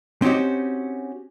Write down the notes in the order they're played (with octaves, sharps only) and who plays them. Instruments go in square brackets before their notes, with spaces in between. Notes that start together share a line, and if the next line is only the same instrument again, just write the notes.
[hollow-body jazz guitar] C4 C#4 D#4 F#4 G4